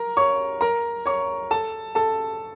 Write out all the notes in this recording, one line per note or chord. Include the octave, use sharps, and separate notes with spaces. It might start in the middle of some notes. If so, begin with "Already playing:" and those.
Already playing: A#4 A#5
C#5 C#6
A#4 A#5
C#5 C#6
A4 A5
A4 A5